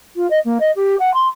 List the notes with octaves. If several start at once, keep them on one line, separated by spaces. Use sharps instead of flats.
F4
D#5
A#3
D#5
G4
F#5
C6